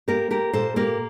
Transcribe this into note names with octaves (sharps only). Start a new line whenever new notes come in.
A#3 G4 A#4
A#3 G4 A#4
A#2 A4 C5
A#3 G4 A#4